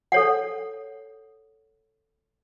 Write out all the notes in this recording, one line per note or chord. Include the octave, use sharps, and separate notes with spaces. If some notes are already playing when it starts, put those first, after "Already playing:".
A4 C#5 F#5